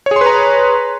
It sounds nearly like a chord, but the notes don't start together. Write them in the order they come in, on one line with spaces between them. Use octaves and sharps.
C#5 G#4 C6 B4 A#5